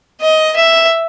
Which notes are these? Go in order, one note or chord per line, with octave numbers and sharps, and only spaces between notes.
D#5
E5